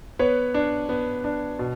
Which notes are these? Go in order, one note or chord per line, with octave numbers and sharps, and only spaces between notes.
B3 B4 C#5
D4
B3
D4
B2